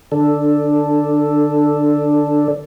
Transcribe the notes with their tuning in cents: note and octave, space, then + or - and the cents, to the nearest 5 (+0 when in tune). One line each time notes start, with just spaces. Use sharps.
D3 +25 D4 +0 A4 +0